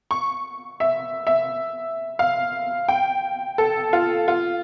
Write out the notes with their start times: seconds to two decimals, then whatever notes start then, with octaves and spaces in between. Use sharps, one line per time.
0.11 C#6
0.80 E5
1.27 E5
2.19 F5
2.88 G5
3.58 A4
3.93 F4
4.28 F4